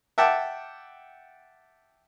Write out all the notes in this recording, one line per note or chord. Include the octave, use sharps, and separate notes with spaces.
E5 F#5 G5 A5 D6